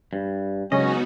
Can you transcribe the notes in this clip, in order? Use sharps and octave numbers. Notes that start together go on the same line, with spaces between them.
G2
C#3 F#3 G#3 B3 C#4 D#4 F#4 D#5